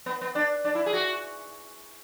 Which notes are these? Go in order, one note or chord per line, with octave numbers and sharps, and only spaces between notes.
B3
B3
D4
D4
E4
G#4
F#4